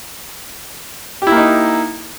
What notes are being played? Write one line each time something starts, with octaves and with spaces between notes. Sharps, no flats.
A#3 D#4 E4 G4